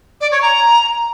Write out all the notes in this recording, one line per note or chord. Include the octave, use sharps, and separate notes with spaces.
D5
C#5
A#5